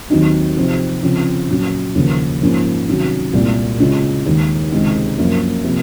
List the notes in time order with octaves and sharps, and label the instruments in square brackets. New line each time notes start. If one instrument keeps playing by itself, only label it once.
[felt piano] D#2 D#3 F#3 C4 D#4
C3 F3 C4 D#4
C#3 F3 C4 F4
A#2 F#3 C#4
D#2 C#3 F3 A#3 C#4
G#2 F3 A#3 C#4 F4
C3 D#3 F#3 C#4 F#4
C2 A#2 G#3
C#3 G#3 C#4 F4
D#2 D#3 G#3
C#2 C3 D#3 G#3 C4
F#2 F3 A#3
C3 F3 A#3